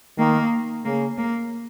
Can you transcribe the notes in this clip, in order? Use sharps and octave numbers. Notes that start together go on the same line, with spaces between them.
D#3 A#3
C#3 A#3
A#3